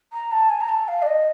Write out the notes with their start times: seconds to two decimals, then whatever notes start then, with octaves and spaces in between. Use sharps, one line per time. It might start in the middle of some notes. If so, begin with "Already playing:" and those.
0.13 A#5
0.32 A5
0.50 G#5
0.61 A#5
0.69 A5
0.88 F5
1.02 D5
1.07 D#5